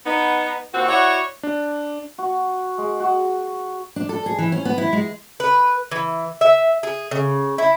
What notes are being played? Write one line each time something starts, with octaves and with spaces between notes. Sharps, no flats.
B3 D#4
D#2 A#2 C4 F#4
E4 F#4 C#5 D5 E5 F#5
D4
F#4
G#3
F#4
D4
A4
G#4
E3
C#4
B3
E4
G#3
B4
E3
E5
G#4
C#3
E4